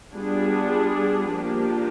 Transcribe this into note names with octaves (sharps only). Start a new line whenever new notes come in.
G3 B3 D4 F4 G#4
F3 A#3 D4 G4